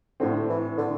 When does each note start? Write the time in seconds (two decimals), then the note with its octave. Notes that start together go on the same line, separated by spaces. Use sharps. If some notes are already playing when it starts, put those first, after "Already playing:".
0.20 A2 D3 A3 C4
0.49 E3
0.78 D3